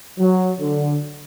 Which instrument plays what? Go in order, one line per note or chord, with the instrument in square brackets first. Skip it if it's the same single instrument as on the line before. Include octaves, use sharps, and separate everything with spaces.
[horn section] F#3
D3